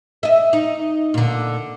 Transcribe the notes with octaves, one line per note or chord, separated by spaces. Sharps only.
D#5 E5
D#4
A#2 D3